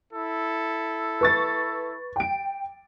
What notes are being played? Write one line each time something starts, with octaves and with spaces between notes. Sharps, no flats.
E4 A4
B4 C#6 A6
G5 D7